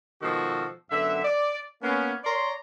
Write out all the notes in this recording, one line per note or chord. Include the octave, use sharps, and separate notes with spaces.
B2 D#3 F3 G#3 F#4 A4
F#2 D3 B3 E5
D5
A#3 B3 C#4
C#5 D5 A#5 C6